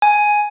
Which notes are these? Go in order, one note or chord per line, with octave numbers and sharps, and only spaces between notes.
G#5